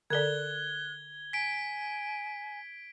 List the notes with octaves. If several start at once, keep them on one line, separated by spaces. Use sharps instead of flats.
D3 A4 D5 F#6 G#6 G7
G#5 B6 D7